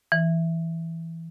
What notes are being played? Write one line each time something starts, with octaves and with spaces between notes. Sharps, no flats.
E3